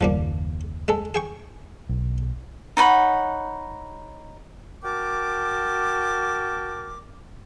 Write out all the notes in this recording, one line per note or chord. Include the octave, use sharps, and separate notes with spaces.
F#1 D#2 F3 G3 A#3
G#3 A4
G#4 G5 C#6
B1
D#4 C#5 F#5 B5
F#4 A#4 G5 A5 D6